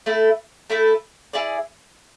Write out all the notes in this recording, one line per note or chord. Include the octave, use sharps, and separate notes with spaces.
A3 E4 A4
A3 E4 A4
E4 G#4 D5